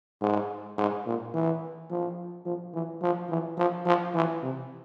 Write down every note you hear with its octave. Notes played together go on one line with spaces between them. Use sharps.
G#2
G#2
A#2
E3
F3
F3
E3
F3
E3
F3
F3
E3
C3